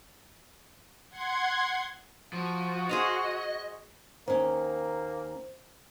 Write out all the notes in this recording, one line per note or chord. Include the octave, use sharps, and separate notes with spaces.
F#5 C6 G#6
F3 F#4
G#4 C5 D#5 F5
D#2 A#3 C#4 C5